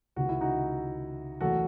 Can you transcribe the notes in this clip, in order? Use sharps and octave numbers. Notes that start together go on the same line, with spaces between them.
C#2 C3 D#3 F#4
E4
D#4 F#4
E2 C3 F#3 A3 F#4 A4